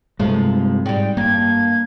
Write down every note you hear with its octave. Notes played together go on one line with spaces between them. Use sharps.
G2 C3 F3 G#3 A3
G#2 G3 G5
G2 A#3 G#6